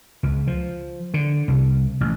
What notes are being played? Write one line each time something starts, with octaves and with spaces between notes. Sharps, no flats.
C#2
F3
D3
C2
A1